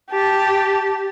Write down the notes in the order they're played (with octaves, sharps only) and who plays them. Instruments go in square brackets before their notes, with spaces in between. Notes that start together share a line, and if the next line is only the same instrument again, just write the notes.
[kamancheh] G4 A5